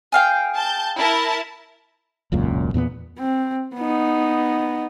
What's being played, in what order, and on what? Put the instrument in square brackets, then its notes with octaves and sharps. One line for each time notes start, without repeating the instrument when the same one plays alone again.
[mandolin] G#4 F5 G5
[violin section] A5 G6
E4 A#4 A5
[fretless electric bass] E1 C#2 F#2 A#2
E2 A#2 A#3 B3
[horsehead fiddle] C4
B3 D#4